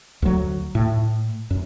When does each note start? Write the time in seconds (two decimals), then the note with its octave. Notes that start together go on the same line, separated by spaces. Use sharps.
0.22 D2 F#3
0.75 A2
1.50 F#2